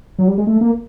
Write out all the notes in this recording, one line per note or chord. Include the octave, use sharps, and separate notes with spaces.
F#3
G3
G#3
A3
A#3